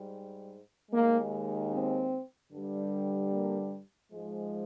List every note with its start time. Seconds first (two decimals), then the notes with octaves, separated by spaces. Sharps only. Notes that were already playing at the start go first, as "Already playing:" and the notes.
Already playing: G#2 G3
0.91 D#2 D#3 G#3 A#3
1.72 C4
2.52 G2 D3 G3
3.32 A#3
4.12 G#2 F3 G#3